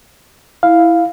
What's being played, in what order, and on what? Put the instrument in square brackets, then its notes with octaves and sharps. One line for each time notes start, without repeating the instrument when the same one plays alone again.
[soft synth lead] E4 [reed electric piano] F5